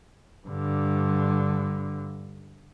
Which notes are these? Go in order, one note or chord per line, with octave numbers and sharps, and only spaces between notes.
G2 D3